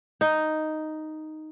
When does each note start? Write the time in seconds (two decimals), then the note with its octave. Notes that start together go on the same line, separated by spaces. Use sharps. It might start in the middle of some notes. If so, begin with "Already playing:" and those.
0.21 D#4